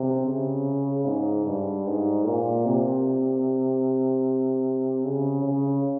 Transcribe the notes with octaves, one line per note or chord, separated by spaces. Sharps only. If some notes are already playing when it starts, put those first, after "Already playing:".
Already playing: C3
C#3
G#2
G2
G#2
A#2
C3
C#3
C#3